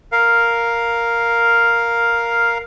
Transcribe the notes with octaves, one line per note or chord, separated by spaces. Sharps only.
A#4 F5